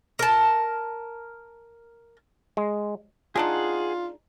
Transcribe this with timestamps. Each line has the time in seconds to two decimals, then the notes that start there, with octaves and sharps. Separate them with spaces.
0.19 A#4 A5
2.57 G#3
3.36 G#3 D4 D#4 F4 G#4 F#5